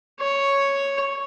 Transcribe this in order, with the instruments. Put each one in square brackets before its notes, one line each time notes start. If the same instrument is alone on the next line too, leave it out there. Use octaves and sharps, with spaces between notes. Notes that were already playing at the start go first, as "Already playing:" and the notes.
[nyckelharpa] C#5